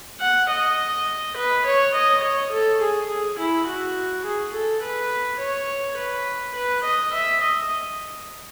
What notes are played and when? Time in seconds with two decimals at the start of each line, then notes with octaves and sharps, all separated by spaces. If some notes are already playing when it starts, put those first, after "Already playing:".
0.21 F#5
0.50 D#5
1.36 B4
1.65 C#5
1.94 D#5
2.22 C#5
2.51 A4
2.80 G#4
3.09 G#4
3.38 E4
3.67 F#4
4.24 G#4
4.53 A4
4.82 B4
5.40 C#5
5.97 B4
6.55 B4
6.84 D#5
7.13 E5
7.41 D#5